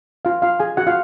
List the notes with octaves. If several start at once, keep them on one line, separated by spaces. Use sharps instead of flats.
F4 F5
F4 F5
G#4 G#5
F#4 F#5
F4 F5